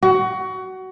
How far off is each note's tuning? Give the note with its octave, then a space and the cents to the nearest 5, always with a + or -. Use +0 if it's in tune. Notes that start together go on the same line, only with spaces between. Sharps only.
F#4 +20